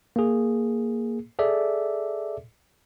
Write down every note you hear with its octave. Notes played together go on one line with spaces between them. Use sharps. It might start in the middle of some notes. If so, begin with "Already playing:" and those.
A#3 G#4
G#4 A4 D5 E5